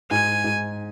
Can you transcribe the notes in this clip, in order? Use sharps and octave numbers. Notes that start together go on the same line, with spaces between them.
G#2 G#5
G#2